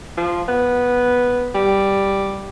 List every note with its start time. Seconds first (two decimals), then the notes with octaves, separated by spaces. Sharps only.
0.18 F3
0.48 B3
1.55 G3